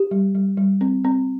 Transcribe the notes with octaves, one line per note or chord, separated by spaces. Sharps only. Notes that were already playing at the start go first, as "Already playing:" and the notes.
Already playing: G4
G3
G3
G3
C4
C4